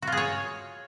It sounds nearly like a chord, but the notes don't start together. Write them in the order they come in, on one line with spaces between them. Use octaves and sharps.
F#4 F4 G#4 C#5